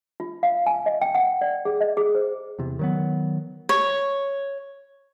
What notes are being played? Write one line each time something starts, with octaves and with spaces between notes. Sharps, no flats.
F4
F5
G#5
D#5
G5
F#5
D5
G#4
D#5
G#4
C5
E2 C3
D#3 F#3 B3
C#5